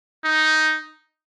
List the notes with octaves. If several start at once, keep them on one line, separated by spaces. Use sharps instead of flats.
D#4